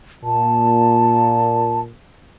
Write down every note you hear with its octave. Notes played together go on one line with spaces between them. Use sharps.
A#2 A5